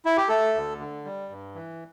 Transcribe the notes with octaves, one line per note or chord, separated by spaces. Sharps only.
E4
G4
A3 A4
D2
D3
G3
G2
E3